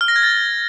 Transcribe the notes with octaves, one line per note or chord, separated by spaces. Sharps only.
F6
A#6
G#6
A6